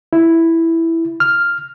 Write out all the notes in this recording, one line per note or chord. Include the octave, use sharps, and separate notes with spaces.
E4
F6